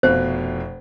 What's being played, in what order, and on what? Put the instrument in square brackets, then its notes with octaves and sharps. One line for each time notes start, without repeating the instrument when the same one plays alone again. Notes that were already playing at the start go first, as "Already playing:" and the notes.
[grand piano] F1 B2 F5 [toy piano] C5